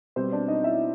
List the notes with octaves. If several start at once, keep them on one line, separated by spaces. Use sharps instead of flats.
B2 G3 C4 C5
D4 D5
D#4 D#5
E4 E5